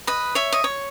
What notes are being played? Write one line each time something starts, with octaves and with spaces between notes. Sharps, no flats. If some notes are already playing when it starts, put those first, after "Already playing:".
B4 D#5
C#5 E5
D#5
C#5